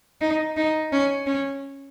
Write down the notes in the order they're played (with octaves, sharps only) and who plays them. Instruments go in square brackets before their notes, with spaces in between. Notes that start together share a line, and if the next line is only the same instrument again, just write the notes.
[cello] D#4
D#4
C#4
C#4